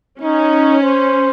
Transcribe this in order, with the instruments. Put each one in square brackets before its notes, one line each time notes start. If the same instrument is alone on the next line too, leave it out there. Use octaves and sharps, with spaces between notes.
[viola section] C#4 [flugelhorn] D#4
[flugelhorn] C5